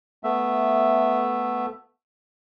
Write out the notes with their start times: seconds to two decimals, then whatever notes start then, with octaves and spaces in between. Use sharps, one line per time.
0.24 A3 B3 E5